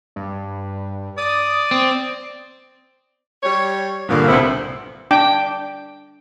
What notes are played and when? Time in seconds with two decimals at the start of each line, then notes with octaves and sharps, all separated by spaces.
0.16 G2
1.18 D5 D#6
1.71 C4
3.43 G3 C#5
4.09 G2 A#2 D3 F3 A#3 B3
4.28 C2 D3 B3 C4 E4 C5
5.11 D4 G5 D6